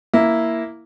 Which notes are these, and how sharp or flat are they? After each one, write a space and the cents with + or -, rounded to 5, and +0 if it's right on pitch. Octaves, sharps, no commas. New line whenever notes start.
A#3 +0 E4 +0